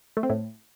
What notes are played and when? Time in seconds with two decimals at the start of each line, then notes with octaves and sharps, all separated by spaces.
0.17 A3
0.23 C4
0.30 A2